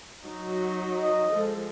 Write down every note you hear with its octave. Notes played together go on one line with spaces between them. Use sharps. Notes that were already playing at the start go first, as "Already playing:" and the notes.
F#3 D#4
D#5
F3 G#3 A4